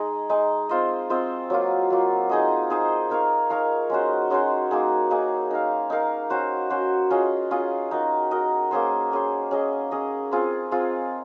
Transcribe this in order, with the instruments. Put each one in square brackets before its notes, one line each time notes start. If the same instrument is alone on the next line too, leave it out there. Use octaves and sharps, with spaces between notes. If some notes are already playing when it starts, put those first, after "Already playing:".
Already playing: [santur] G#3 D#4 G#4 D#5
G#3 D#4 G#4 D#5
C4 F4 C5 D#5
C4 F4 C5 D#5
F#3 A#3 F4
F#3 A#3 F4
D#4 G#4 C5 D#5
D#4 G#4 C5 D#5
D#4 A#4 C#5 F5
D#4 A#4 C#5 F5
G#3 C#4 F#4 C5
G#3 C#4 F#4 C5
A#3 D#4 G#4
A#3 D#4 G#4
D#4 A#4 F5
D#4 A#4 F5
C#4 F#4 C5
C#4 F#4 C5
C#4 F4 G#4 D#5
C#4 F4 G#4 D#5
D#4 F#4 A#4 D#5
D#4 F#4 A#4 D#5
A#3 C#4 G#4 C5
A#3 C#4 G#4 C5
C#4 G#4 D#5
C#4 G#4 D#5
C4 F4 G#4
C4 F4 G#4